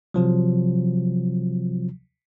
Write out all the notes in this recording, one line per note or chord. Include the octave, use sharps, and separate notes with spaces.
C3 F3 F#3